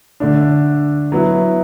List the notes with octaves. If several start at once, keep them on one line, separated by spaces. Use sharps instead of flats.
D3 A3 D4
F#3 B3 E4